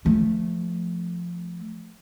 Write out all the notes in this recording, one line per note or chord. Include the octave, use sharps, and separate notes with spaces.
F3 A3